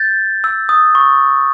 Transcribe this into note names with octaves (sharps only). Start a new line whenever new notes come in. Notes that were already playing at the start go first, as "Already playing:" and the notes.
Already playing: G6 A6
E6
D#6
C#6